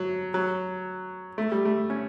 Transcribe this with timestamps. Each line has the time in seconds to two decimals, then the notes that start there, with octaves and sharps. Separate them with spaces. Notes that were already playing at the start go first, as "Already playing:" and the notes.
Already playing: F#3
0.34 F#3
1.38 A3
1.52 G3
1.65 A3
1.90 C#4